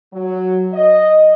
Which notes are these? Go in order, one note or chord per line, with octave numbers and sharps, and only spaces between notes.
F#3
D#5